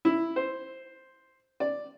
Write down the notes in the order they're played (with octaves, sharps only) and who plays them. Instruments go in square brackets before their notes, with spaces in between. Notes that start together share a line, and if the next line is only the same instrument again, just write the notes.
[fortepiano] E4
C5
D5